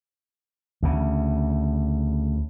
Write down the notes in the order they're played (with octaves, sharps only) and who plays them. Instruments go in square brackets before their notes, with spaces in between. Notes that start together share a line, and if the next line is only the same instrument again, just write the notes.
[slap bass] D2 C#3